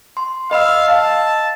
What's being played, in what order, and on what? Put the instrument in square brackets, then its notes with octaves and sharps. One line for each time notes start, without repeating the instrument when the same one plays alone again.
[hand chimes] C6
[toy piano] B4 B5 [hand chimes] D#5 E6 [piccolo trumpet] F5
[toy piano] F5 [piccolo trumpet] A5